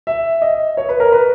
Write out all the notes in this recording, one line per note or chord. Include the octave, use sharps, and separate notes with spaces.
E5
D#5
C#5
B4
A#4
B4